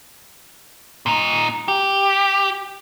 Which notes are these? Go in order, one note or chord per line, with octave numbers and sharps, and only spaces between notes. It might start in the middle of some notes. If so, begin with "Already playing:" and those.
A#2 D#4
G4